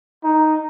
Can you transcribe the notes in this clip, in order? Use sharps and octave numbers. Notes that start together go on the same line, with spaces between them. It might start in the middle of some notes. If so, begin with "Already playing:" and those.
D#4